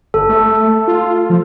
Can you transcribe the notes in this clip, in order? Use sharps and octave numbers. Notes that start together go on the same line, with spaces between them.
G1 A4
A3
F4
F3